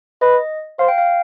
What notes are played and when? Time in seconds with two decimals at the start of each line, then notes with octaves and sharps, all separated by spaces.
0.22 B4 D#5
0.79 C5 F5
0.88 G5
0.98 F5